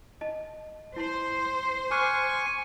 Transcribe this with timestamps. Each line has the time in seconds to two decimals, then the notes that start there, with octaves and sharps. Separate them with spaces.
0.21 D#5 A5
0.96 E4 C5 A5 C6
1.91 G#5 C#6 D6 F6 F#6